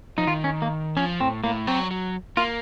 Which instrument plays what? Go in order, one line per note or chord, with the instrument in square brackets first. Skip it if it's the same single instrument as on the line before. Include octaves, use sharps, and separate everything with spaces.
[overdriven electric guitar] F3 [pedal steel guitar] D#4
[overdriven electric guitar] D#3 [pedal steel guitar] F4
[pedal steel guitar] C#4
A#3
[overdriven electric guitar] F3 [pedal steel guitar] C#4
[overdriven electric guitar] A2 [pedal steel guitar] C4
[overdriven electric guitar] A2 [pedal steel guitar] A#3
[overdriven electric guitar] F#3 [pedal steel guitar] C4
[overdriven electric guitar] F#3
[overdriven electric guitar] A#3 [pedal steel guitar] F4